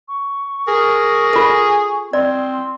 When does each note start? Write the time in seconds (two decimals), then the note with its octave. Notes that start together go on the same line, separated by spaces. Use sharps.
0.08 C#6
0.68 G#4 A#4
1.33 F4 A4
2.13 C4 D5 C6